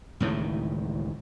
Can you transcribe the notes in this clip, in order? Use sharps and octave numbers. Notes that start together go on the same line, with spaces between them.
C#2 A2 D#3 E3